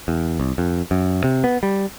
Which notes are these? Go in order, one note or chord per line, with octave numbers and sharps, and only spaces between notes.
E2
C2
F2
F#2
C3
B3
G3